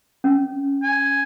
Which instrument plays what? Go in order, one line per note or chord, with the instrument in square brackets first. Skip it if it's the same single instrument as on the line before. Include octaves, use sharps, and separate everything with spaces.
[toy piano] C#4
[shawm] G#5